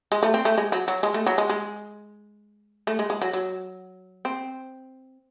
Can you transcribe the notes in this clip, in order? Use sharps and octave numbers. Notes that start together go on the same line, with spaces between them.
G#3
A3
C4
A3
G#3
F#3
F#3
G#3
A3
F#3
G#3
G#3
A3
G#3
G#3
F#3
F#3
C4